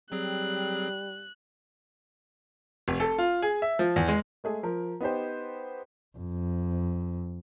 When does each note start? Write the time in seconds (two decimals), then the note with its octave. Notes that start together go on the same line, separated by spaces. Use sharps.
0.12 F#3 G3 C4 G#4 F#6
2.88 F1
3.00 A4
3.19 F4
3.42 G#4
3.62 E5
3.79 F3
3.96 E2
4.08 G#3
4.44 G#3 A3 G#4
4.63 F3 A#4
5.01 B3 D#4 G4 C5
6.18 F2